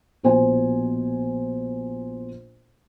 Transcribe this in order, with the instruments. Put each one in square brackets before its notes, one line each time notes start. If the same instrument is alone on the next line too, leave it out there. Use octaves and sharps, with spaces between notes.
[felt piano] A#1 B2 C5 G#5